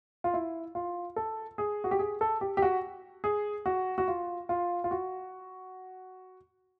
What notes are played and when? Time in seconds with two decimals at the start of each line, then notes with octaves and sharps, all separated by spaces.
0.24 F4
0.34 E4
0.75 F4
1.16 A4
1.58 G#4
1.84 F#4
1.91 G4
1.99 G#4
2.21 A4
2.41 G4
2.57 G4
2.62 F#4
3.24 G#4
3.66 F#4
3.98 F#4
4.08 F4
4.49 F4
4.84 F4
4.91 F#4